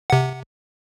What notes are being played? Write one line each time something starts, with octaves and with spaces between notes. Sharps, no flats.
C3 F#5